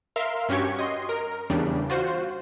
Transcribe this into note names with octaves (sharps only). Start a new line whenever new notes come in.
A#4 E5 F5 C6
G2 C#4 F#4 G4 C#6 G#6
D#5 C6
A#4
E2 C#3 G3 D4
F4 F#4 C5